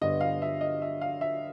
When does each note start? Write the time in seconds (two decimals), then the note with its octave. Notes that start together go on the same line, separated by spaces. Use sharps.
0.01 G2 D3 G3 B3 D#5
0.21 F5
0.42 E5
0.61 D#5
0.82 E5
1.01 F5
1.21 E5